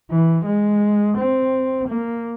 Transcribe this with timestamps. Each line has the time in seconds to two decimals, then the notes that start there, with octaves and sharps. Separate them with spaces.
0.11 E3
0.46 G#3
1.18 C4
1.88 A#3